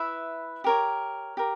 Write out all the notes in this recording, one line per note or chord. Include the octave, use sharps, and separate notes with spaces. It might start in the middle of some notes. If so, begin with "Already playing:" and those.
Already playing: E4 B4 E5 B5
G4 A#4 C#5
G4 A#4